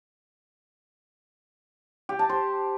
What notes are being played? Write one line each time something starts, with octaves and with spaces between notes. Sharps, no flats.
G4
A5
C5